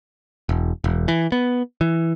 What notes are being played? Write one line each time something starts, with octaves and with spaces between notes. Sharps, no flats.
E1
E1
E3
B3
E3